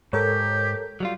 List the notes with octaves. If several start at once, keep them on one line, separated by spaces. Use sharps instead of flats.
G#2 G4 A4 A#4 C#5
F#3 G3 F4